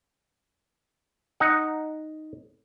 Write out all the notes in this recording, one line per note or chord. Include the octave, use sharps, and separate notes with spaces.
D#4 F#5